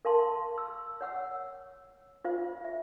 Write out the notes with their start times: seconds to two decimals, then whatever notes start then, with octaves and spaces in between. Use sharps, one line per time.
0.05 A#4 F5 A5 C6
0.58 E6
1.01 C#5 F#5 E6
2.25 F4 C5 F5
2.65 E5